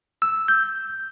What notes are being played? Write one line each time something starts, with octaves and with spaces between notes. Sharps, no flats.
E6
G6